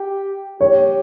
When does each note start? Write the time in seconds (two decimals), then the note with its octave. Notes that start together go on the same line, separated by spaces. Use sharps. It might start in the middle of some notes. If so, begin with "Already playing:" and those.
Already playing: G4
0.60 G4 C#5